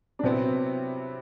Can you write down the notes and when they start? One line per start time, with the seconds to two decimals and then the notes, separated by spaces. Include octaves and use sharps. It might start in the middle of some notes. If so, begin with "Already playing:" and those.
0.19 D4
0.23 C3 F#3 B3 C4 E4